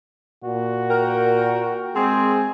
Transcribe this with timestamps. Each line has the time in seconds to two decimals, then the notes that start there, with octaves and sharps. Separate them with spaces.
0.44 A#2 F#4
0.90 A#4 G5
1.95 G#3 C4 G#4